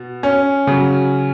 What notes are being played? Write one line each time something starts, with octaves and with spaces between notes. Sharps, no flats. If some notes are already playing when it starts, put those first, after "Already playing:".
Already playing: B2
C#4
C#3 F#3